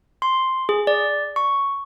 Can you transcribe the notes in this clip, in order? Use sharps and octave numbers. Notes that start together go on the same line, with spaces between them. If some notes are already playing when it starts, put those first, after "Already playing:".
C6
G#4
D5
C#6